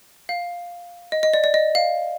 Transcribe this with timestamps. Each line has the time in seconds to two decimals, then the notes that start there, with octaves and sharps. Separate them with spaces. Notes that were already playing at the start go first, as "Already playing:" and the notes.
0.29 F5
1.12 D#5
1.23 D#5
1.34 D5
1.44 D5
1.54 D#5
1.75 F5